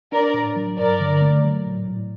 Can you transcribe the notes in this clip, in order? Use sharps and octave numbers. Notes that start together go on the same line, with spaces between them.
D4 A#4 D5
A2
F#3
G2 A#4 D5
D3
A3
F#3
A2
A2